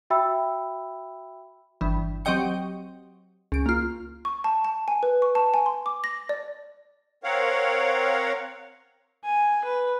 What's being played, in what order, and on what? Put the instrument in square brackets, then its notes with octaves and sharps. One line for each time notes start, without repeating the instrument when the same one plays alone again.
[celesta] F#4 E5 G5 B5 E6
[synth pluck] G1 E3
F#3 C4 G4 D#5 G5 C#7
C#2 D7
A#3 F4
[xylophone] C#6
A5
A5
G#5
B4
C#6
A5
G#5
C6
D6
A#6
D5
[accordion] C4 A#4 C#5 F5 F#5
[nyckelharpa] G#5
B4